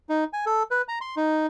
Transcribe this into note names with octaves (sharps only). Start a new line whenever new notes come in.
D#4
G#5
A4
B4
A#5
C6
D#4